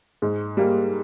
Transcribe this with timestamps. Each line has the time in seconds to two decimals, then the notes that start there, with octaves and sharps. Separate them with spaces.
0.22 G#2
0.57 G3 A#3